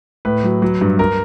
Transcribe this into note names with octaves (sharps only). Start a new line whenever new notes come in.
A2 B4
F#3
F#3
G2
A#4